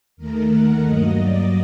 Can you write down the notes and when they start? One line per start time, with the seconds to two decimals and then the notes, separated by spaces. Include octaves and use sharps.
0.17 D#2 D#3 A3 A#4
0.49 F#5
0.83 G2 F#3 A#3 D#5
1.16 D5